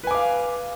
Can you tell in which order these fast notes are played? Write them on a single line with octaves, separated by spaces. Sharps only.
B4 G#5 D6 F5